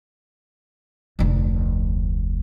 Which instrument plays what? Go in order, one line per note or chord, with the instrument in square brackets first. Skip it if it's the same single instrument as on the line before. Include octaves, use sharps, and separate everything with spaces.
[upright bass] F1 D2